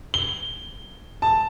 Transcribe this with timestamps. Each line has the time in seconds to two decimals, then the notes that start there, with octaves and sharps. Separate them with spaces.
0.14 G7
1.22 A5